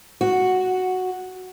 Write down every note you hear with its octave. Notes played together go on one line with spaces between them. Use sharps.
F#4